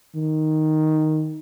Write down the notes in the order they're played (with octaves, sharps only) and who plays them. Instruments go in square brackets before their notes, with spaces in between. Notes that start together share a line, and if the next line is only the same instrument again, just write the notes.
[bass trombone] D#3